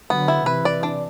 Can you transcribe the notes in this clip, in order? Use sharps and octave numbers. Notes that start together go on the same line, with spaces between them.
D3 F#3 B3
E4
C3 E3 B4
D5
D4